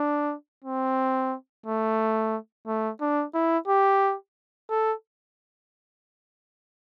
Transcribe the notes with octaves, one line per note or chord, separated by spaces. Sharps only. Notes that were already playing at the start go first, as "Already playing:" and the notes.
Already playing: D4
C4
A3
A3
D4
E4
G4
A4